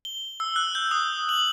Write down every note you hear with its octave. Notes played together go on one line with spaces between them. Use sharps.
G7
E6
F#6
G6
D#6
F#7